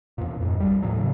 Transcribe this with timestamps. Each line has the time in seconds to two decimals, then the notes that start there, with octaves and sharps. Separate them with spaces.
0.18 E2 A#2
0.41 F2 G#2
0.60 A#1 G3
0.83 D#2 A2 F3 F#3
1.00 A2 C#3